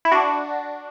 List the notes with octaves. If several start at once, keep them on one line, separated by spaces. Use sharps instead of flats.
E4
D4 F#4